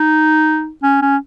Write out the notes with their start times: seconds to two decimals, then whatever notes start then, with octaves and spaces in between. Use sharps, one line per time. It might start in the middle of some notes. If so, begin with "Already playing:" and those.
Already playing: D#4
0.83 C#4
1.02 C#4